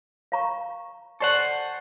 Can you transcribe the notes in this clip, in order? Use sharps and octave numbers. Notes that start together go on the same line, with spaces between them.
F5 A#5 C#6
A4 C5 D5 F#5 G#5 C#6